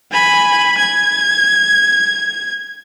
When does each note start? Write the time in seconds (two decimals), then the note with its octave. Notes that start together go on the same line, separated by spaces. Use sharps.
0.11 G#5 B5
0.78 G#6